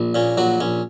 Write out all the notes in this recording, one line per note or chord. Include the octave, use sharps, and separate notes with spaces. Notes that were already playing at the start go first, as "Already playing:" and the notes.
Already playing: A#1
A#2 C#4
A#1 F#3 F#4
A#1 C#4